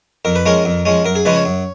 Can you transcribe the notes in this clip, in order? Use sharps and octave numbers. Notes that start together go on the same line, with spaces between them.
F2 A#4
B4
F3 G#3 C#4 A#4
F2
F3 G#3 C#4
F#2 A#4
G#4
C#3 F3 G#3 C#4 B4
C#5
F#2